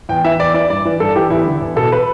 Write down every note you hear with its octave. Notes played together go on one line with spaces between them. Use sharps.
E2 G5
E3 E5
E2 D5
E3 D5
G2 D5
E3
G2 A4
E3 G4
E2 E4
D3
E2
B2 A4
B4